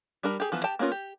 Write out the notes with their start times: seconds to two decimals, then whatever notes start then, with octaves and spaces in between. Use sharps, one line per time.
0.23 G3 D4 A#4 B5
0.40 G4 G#4
0.52 E3 F3 B3
0.64 G4 G5 A5
0.79 A#3 B3 C#4 F4 A#4
0.92 G4